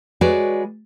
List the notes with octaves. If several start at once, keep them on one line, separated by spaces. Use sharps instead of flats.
G#3 F#4 B4 C#5 D5